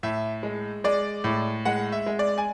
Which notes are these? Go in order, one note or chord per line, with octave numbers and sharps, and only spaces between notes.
A2 E5
G#3
G#3 D5
A2
G#3 F#5
E5
G#3
D5
G#5